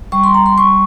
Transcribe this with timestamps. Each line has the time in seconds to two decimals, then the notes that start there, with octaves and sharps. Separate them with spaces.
0.12 G3 C#6
0.24 C6
0.34 A#5
0.46 C6
0.58 G3 C#6